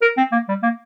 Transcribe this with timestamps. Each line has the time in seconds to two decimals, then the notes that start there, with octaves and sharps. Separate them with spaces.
0.02 A#4
0.18 C4
0.32 A#3
0.49 G3
0.63 A#3